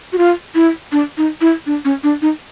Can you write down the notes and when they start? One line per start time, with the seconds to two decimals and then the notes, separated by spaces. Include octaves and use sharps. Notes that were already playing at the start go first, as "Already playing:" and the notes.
0.13 F#4
0.18 F4
0.55 E4
0.92 D4
1.18 D#4
1.41 E4
1.66 D4
1.85 C#4
2.03 D4
2.22 D#4